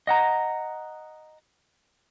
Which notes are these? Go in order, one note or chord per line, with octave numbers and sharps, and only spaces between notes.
D#5 F#5 A#5